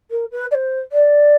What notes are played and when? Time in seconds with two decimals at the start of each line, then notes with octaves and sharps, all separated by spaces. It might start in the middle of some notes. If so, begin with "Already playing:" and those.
0.11 A#4
0.32 B4
0.51 D5
0.55 C5
0.92 D5